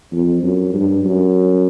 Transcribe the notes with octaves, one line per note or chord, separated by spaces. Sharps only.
F2
F#2
G2
F#2